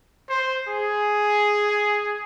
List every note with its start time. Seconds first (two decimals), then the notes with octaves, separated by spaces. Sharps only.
0.29 C5
0.68 G#4